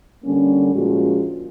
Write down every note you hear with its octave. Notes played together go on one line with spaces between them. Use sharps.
D3 G3 A#3 C#4
A#2 F3 G#3 C#4 F#4